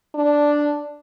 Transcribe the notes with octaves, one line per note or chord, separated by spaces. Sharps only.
D4